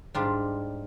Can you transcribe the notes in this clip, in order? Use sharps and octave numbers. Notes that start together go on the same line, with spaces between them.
G#2 G3 D4 F4